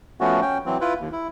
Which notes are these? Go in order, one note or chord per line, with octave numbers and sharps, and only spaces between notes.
F3 A3 B3 C#4 F#4
C#4 G5
E3 F#3 C4
E4 F4 B4
D#2
E4